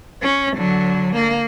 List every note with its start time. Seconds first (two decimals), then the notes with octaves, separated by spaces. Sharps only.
0.22 C#4
0.56 D3 F#3
1.16 A#3